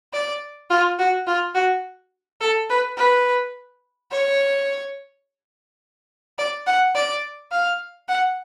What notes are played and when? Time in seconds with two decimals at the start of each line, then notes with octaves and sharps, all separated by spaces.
0.13 D5
0.70 F4
0.99 F#4
1.27 F4
1.55 F#4
2.41 A4
2.69 B4
2.97 B4
4.11 C#5
6.38 D5
6.67 F#5
6.94 D5
7.51 F5
8.08 F#5